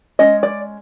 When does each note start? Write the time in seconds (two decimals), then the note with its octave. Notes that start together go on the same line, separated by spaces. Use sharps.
0.19 G#3 C#4 D#5
0.43 D5